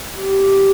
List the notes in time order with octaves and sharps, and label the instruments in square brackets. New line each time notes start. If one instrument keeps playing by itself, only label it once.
[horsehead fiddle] G4